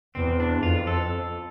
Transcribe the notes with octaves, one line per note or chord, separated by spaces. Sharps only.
E2 C4
D4
F2 F4
A4